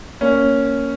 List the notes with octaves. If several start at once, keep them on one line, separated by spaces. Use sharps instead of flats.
A#3 C#4